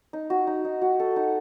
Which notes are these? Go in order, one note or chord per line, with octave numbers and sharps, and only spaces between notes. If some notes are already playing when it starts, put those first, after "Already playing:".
D#4
F#4
D#4
D#4
F#4
A4
D#4